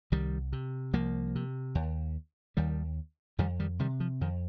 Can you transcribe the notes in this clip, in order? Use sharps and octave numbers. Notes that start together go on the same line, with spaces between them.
C2 D#3 G3
C3
C2 F3 A#3
C3
D#2
D#2 D#3 G3
F2 D#3 G3
D#3 G3
C3 D#3 G3
F3
F2 D#3